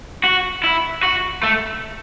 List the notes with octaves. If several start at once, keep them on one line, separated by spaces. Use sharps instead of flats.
F#4
E4
F#4
A3